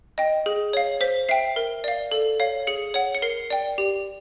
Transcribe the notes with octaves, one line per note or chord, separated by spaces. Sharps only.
D#5 G5
G#4
C#5 F5
C5 B6
E5 G5 C7
A#4
D5 F5
A4
C#5 F5
G#4 C#7
C#5 F#5
C#7
A#4 C7
D5 G5
G4